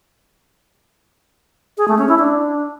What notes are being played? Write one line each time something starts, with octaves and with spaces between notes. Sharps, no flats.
G#4
A3
C#4
E4
D4